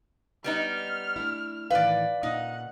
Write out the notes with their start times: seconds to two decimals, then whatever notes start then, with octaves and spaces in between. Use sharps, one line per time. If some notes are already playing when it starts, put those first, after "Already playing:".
0.44 G3 B3 D#4 F6
1.16 A3 D4 E4
1.70 A2 D#3 E3 B4 D5 F5
2.23 A#2 C#3 D#4 D#5 F#5